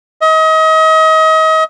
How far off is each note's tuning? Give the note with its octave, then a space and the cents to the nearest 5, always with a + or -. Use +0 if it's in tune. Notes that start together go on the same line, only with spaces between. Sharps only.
D#5 +35